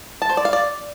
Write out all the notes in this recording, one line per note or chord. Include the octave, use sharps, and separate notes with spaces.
A5
C5
D5
F5
D5